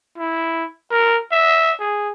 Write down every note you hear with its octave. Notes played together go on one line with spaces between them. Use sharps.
E4
A#4
E5
G#4